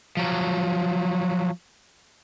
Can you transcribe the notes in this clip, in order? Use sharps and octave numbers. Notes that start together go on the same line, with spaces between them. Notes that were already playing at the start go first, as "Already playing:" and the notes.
F3 F#3